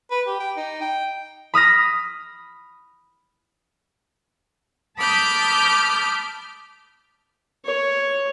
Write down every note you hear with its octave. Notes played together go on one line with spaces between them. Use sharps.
B4
G4
G5
D#4
G5
B5 D#6 F6 A#6
A5 B5 D6 D#6 F6 G6
C#5